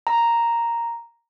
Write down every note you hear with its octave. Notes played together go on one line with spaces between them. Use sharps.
A#5